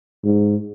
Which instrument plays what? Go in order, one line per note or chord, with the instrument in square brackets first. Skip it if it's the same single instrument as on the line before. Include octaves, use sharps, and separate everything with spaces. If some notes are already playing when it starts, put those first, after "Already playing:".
[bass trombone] G#2